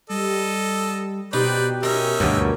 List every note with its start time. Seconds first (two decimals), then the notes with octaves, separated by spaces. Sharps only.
0.10 G3 A4 D#5
1.33 B2 D#4 G4 B4 C5 D5
1.83 C#4 D#4 A#4 E5
2.20 D2 G2 B2 A#3 C#5